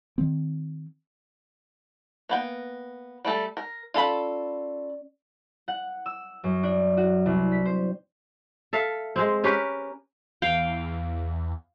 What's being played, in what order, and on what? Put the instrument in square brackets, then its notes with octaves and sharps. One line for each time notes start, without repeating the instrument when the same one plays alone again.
[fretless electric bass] D#3 C4
[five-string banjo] A#3 B3 G5
G3 A3 A4
A#4
[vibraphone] C#4 D5 [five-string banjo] F4 A4 B5
[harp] F#5
E6
F#2
D4
F#4
C2
B6
C5
[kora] A4 E5 F5
G#3 C4
C#4 G4 A#4 B4
[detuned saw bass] E2 [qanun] F5 G5